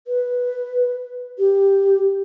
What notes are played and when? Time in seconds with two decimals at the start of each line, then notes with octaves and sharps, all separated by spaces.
0.07 B4
1.39 G4